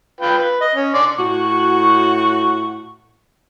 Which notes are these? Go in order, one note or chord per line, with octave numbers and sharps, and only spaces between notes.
F4 B4 G5
B4
D#5
C#4
D4 D5 C6
A2 F#4